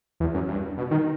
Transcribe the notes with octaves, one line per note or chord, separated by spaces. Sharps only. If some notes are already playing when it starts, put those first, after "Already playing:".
E2
F#2
G2
B2
D#3